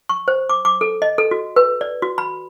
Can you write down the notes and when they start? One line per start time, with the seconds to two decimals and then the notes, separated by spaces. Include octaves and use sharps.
0.09 C#6
0.28 C5
0.49 D6
0.65 D6
0.81 A4
1.02 D#5
1.18 A4
1.31 F#4
1.56 B4
1.81 D5
2.02 F#4
2.18 B5